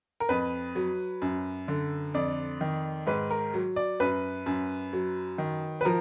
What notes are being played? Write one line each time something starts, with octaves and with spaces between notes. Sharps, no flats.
A#4
F2 B4
F#3
F#2
D3
F2 D5
D#3
G#2 B4
A#4
F#3
D5
F#2 B4
F#2
F#3
D#3
B4
F3 A#4